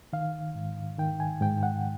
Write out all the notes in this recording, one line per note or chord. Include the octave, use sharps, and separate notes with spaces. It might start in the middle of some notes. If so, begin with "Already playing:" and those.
D#3 F5
G#2
D#3 G5
G#5
G#2 G5
F#5